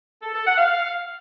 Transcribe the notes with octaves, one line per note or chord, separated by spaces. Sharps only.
A4
A4
F#5
F5